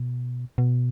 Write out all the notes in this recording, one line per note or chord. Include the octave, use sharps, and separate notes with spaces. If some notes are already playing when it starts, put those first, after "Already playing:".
Already playing: B2
B2